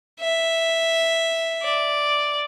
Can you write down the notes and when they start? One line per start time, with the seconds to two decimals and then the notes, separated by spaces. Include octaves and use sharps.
0.20 E5
1.62 D5